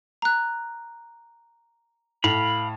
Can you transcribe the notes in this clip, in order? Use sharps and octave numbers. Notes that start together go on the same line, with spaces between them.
A#5 F#6
A2 F5 B5